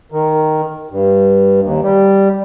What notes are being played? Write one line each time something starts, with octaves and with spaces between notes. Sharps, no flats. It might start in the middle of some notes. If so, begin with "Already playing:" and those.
D#3
G2
D#2
G3